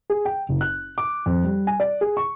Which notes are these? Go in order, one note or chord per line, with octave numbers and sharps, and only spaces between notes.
G#4
G5
F#1
F#6
D6
F2
G3
G#5
D5
G#4
C#6